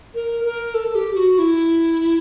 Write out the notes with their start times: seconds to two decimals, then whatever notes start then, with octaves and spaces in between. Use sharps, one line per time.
0.15 A#4
0.44 A#4
0.74 A4
0.95 G4
1.15 F#4
1.34 F#4
1.39 E4